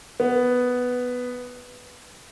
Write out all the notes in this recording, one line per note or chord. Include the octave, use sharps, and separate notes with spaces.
B3